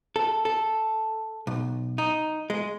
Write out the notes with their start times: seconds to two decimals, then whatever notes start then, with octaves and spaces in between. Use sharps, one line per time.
0.16 A4
0.45 A4
1.47 B1
1.98 D#4
2.50 G#3